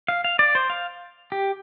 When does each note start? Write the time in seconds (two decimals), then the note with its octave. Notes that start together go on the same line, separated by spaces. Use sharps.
0.08 F5
0.24 F5
0.39 D5
0.55 C5
0.70 F5
1.32 G4